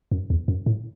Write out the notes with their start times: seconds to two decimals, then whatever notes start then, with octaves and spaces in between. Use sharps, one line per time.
0.11 F#2
0.30 E2
0.48 F#2
0.66 A2